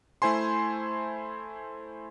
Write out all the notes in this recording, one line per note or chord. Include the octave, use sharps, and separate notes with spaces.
A3 E4 C5 G#5 C6